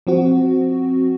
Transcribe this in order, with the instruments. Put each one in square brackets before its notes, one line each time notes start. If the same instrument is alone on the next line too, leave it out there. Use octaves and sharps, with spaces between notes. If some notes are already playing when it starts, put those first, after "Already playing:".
[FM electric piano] F3 C4 F#4